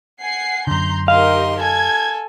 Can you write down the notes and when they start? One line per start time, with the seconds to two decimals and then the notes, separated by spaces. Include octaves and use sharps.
0.19 F#5 G#5 C7
0.67 F#2 D3 A#5 C6 G6
1.08 D#4 G4 A#4 D#5 F5 C6
1.59 A4 G#5 G#6